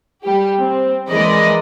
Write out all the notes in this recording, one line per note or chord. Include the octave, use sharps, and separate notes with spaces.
G3 G4
C4
E3 G#3 A#4 D5 D#5 B5